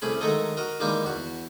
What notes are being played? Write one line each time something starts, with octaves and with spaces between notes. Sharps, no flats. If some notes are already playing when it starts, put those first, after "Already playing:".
C2 A3 C#4 G#4 B5
D#3 F#3 G#3 A3 A4 D#5
F#4 A#4 D#5
D#3 E3 G3 G#3 A#3 D#4
E2 F#4